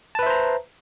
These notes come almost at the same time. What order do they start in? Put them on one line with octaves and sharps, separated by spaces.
A5 B4 E5 C5 A#5